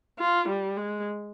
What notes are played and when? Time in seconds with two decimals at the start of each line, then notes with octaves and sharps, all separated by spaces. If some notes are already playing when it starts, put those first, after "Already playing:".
0.19 F4
0.48 G3
0.77 G#3